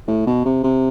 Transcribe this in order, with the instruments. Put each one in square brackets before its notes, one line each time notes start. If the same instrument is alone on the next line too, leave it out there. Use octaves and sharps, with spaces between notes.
[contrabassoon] A2
B2
C3
C3